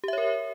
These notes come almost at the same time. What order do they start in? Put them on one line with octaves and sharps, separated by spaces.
G4 E5 C#5 A#4